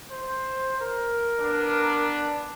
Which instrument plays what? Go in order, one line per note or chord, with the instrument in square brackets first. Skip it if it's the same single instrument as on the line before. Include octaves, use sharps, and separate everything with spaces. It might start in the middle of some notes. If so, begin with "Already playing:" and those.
[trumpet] C5
A#4
[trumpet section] B3 D4